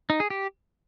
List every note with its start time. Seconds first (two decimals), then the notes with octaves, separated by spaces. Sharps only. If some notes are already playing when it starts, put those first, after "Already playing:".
0.10 D#4
0.20 G#4
0.30 G4